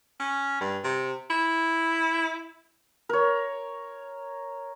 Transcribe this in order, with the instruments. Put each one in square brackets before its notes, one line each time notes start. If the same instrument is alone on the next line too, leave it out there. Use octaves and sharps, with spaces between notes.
[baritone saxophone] C#4
G2
C3
E4
[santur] A#4 C#5